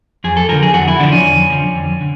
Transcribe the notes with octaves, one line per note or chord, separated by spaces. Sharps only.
F2 G#4
A4
D3 F3 A#4
G#4
F2 F#4
E4
D3 F3 D4
C#4
F2
D3 F3
F2
D3